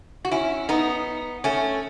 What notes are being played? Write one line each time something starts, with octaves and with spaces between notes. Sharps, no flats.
F#4
C#4 E4
B3 D#4
A3 C#4